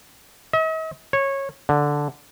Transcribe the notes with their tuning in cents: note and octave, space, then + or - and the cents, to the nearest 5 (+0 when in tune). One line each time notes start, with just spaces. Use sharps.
D#5 +45
C#5 -15
D3 -5